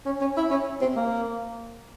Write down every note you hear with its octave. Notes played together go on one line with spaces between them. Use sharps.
C#4
C#4
E4
C#4
C4
A#3